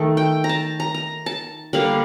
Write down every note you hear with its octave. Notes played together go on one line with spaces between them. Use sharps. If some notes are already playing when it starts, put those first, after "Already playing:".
Already playing: D#3 A3 A4
G5
A#5
A5
A#5
A#5
A5
D3 G3 A#3 F5